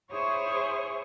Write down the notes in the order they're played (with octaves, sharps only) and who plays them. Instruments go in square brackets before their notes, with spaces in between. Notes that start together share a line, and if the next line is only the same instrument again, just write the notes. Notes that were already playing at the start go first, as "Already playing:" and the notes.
[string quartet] E4 G#4 C5 C#5 C#6 D#6